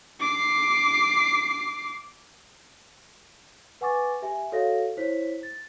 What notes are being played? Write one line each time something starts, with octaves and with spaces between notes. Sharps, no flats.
D6 C7
B4 F#5 G#5 C#6 D6 A6
G4 E5 G#5
F#4 A4 C#5 D#5 F5 A#6
E4 C5 C#5 B6
A6